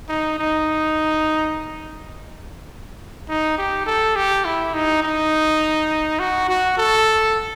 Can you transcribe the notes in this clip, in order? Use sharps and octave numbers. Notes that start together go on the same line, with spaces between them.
D#4
D#4
D#4
G4
A4
G4
E4
D#4
D#4
F#4
F#4
A4